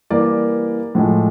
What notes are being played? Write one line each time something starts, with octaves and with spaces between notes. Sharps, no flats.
E3 G3 A#3 D5
A2 F3 G#3